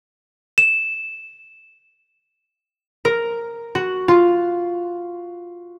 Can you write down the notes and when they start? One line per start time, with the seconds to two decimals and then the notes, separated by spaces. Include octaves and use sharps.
0.58 E7
3.05 A#4
3.75 F#4
4.08 F4